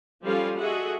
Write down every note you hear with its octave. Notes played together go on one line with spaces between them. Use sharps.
F3 G3 C#4 F4 A4 F5
F#4 G#4 A4 D#5 E5 F#5